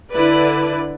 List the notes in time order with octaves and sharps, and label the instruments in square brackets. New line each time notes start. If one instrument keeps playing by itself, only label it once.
[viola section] D3 E4 B4 D5